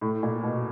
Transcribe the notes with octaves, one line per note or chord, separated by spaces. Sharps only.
A2
A#2
B2